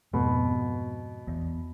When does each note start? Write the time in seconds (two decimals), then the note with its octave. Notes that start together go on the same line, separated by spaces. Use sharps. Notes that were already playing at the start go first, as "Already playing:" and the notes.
0.13 F2 G#2 B2
1.28 E2